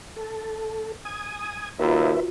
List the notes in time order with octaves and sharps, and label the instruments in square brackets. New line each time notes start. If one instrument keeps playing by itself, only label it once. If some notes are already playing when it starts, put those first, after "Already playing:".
[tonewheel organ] A4
G#5 D#6
[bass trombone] D#2 [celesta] F4 F#4 [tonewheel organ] A#4 B4 E5